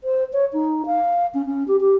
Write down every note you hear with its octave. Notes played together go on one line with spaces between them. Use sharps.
C5
C#5
D#4
F5
C#4
C#4
G4
G4